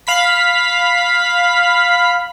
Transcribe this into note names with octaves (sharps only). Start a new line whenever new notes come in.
F5 B5 B6